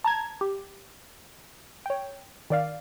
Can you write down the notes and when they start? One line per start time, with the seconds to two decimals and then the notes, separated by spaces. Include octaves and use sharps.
0.04 A5 A#5 G#6
0.41 G4
1.86 C#5 G5
2.50 D#3 D5 F5